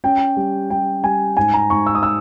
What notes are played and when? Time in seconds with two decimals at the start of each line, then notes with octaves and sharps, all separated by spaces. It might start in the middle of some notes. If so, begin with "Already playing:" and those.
0.04 C#4 G5
0.37 G3
0.70 G3 G5
1.04 G3 G#5
1.37 G#2 G#5
1.54 A#5
1.70 G#2 C#6
1.86 E6
1.95 D#6
2.03 E6